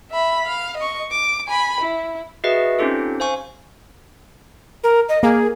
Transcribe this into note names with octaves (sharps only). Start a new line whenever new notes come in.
E5 B5
F5
D#5 C#6
D6
G#5 B5
E4
F#4 G#4 B4 D#5 E5
C4 C#4 D#4 F4 G4 A4
C5 F5 G#5 C#6
A#4
D#5
A#3 G#4